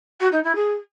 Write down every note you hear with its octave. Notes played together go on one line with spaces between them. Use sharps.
F#4
D#4
E4
G#4